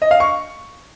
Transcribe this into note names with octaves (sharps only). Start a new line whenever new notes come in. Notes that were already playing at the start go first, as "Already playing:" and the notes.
D#5
F5
C#6